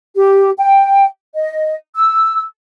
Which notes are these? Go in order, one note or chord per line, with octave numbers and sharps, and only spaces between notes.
G4
G5
D#5
E6